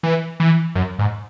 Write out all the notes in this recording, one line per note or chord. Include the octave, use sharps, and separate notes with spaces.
E3
E3
F#2
G#2